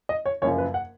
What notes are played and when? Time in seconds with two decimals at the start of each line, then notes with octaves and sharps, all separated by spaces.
0.09 D#5
0.26 C#5
0.42 F#1 F#2 F3 C#5
0.58 B4
0.74 F#5